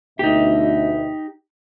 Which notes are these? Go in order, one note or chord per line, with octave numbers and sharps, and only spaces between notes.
D2 B2 D#4 G4 E5